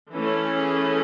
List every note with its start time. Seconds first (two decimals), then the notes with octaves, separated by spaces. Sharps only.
0.12 E3 A3 C#4 A4
0.53 G#4